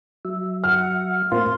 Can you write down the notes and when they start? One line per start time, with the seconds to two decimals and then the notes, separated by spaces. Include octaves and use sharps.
0.25 F#3 E5
0.64 F#5 F6
1.32 A2 A#3 C4 F4 C6